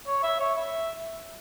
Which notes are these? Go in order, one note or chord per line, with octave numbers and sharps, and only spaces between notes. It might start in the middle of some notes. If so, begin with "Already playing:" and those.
C#5
E5
C#5
E5